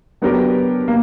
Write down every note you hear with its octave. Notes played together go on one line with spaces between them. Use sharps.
F#3 B3 D4 G4 A#4
A#3